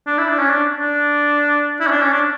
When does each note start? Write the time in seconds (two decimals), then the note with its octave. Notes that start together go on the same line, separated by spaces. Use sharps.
0.07 D4
0.18 E4
0.28 D4
0.39 C#4
0.50 D4
0.79 D4
1.81 E4
1.87 C#4
1.91 D4
2.02 C#4
2.12 D4